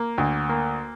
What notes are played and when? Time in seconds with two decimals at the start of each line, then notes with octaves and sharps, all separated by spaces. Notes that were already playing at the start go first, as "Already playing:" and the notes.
Already playing: A#3
0.18 D2
0.49 A#3